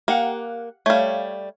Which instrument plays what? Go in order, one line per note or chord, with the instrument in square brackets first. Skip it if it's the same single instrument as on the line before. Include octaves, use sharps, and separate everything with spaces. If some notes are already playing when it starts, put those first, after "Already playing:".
[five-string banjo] A#3 [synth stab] G4 F5 F#5
[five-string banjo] G3 A3 [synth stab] C#5 F5